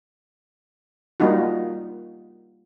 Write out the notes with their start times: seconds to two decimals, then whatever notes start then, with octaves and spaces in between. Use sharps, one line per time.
1.20 G3 A#3 D#4 F4 F#4